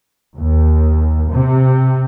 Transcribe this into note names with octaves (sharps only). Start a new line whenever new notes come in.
D#2
C3